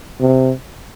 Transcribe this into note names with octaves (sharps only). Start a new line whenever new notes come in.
C3